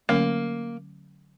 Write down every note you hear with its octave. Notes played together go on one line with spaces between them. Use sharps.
D3 F#3 A3 A#3 C#4